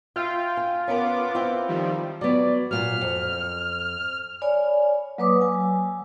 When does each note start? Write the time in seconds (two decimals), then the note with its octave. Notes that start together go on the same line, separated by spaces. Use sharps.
0.16 F4 E5 G5
0.57 G#5
0.88 B3 C#4 A#4 D6
1.35 C4 E4 F4
1.68 D#3 F3 G3
2.21 F#3 B3 D5
2.71 A#2 F#3 F6
3.01 F2
4.42 C#5 D5 G#5 B5
5.18 F#3 A#3 B4 C#5 D6 D#6
5.40 F#3 G#5 E6